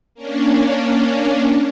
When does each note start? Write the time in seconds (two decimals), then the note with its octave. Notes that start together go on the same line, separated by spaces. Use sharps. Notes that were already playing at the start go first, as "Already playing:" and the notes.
0.15 A#3 C#4 D4